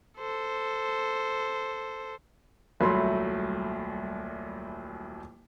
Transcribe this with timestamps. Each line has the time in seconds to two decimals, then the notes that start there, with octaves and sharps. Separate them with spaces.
0.19 A4 C5
2.80 D#1 C2 F#3 A3 B5 C6